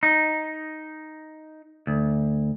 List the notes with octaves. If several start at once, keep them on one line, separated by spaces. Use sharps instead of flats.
D#4
D2